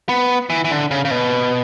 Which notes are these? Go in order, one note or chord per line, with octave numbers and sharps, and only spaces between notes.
B3
E3
E3
D3
C#3
C#3
B2